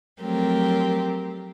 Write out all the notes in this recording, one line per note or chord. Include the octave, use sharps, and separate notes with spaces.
F3 F#3 A3 C4 G4 A#4